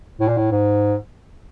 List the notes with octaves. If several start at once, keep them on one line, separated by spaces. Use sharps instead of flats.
A2
A#2
A2
G#2